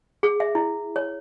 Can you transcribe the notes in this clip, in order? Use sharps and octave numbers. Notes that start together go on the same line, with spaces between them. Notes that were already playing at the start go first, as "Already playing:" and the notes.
G#4
E5
E4
C#5